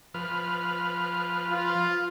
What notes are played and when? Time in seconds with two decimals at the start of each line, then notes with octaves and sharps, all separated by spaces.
0.14 F3 B4 F6
1.49 F4